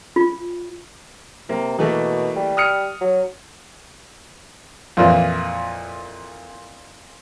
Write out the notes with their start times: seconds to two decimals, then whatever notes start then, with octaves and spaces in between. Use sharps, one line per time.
0.16 F4
1.49 C3 A#3
1.79 B2 E3 A3 A#3
2.36 G3
2.57 D#6 F6 C#7
3.01 F#3
4.97 F2 A#2 E3